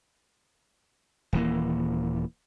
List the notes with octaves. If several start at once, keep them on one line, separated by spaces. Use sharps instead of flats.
D#1 E3 A#3